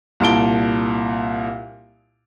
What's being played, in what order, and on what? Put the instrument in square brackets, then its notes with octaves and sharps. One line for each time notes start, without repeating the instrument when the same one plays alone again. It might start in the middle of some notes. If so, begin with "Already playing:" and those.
[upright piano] C2 A#2 A5 D7 G7